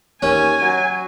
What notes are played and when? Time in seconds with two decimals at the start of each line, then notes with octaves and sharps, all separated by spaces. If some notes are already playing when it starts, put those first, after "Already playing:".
0.22 D#2 C#4 G#5
0.62 F#3